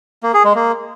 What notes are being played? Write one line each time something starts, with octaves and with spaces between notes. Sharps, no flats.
A#3
G#4
G#3
A#3